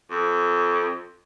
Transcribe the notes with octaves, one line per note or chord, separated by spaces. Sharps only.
F2